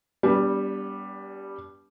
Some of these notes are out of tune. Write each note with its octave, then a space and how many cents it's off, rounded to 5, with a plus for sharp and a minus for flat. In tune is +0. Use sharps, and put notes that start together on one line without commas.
G3 +0 B3 -20 D4 -40